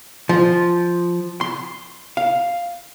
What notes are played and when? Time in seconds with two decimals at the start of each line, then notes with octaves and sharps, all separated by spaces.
0.29 F3
1.41 C6
2.17 F5